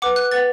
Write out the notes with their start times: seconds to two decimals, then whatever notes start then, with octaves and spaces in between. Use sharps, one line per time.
0.02 B4 F#5 D6
0.16 F#6
0.31 B4 F#5 A6